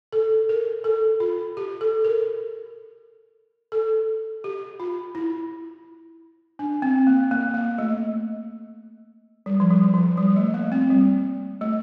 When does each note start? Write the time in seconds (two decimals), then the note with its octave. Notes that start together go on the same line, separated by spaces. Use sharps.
0.13 A4
0.49 A#4
0.84 A4
1.20 F4
1.57 G4
1.81 A4
2.05 A#4
3.72 A4
4.44 G4
4.80 F4
5.15 E4
6.59 D4
6.82 C4
7.07 A#3
7.31 A#3
7.54 A#3
7.78 A3
9.46 G3
9.60 F3
9.71 G3
9.94 F3
10.17 G3
10.36 A3
10.54 A#3
10.72 C4
10.90 G3
11.61 A3